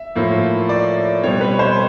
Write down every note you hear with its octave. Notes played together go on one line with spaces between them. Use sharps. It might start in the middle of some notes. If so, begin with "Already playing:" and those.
Already playing: E5
A2 F3 A#3
D5
B2 G3 C4 C#5
B4
C5